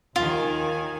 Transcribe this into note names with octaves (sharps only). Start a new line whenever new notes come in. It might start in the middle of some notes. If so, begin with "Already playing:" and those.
D#2 D#3 F4 G#5